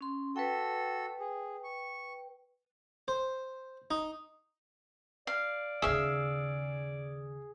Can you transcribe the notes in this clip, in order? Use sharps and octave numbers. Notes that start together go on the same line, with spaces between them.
C#4 C6
F#4 A4 B4 G5 E6
G#4
C#6
C5
D#4
D5 F5
D#2 C#3 G#4 E5 F5